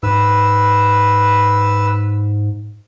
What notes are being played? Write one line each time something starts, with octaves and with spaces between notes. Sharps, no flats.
G#2 B4 E6